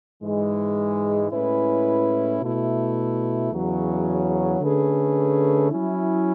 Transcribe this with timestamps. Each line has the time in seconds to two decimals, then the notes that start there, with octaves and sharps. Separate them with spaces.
0.21 G#2 E3 G#3
1.30 A2 G#3 C#4 E4 B4
2.40 B2 A3 E4
3.51 E2 C#3 F#3
4.60 D3 A3 C#4 G#4 B4
5.70 F#3 C#4 E4